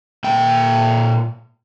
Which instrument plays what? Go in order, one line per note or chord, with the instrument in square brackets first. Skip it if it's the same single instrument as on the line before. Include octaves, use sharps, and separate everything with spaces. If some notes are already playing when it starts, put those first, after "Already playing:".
[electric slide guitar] A#2 G5